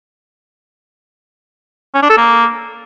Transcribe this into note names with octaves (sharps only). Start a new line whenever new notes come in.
C#4
D4
A4
A#3